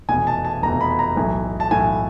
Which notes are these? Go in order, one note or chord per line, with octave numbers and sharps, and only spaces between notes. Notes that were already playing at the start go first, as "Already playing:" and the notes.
F1 E2 B2 G#5
A5
A5
F1 E2 B2 A#5
B5
A#5
B1 A2 E3
A5
B1 A2 E3 G#5